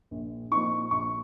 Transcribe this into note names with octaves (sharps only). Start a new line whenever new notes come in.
A#1
A#2 F3 C4 D#4 C#6
A#1 C#6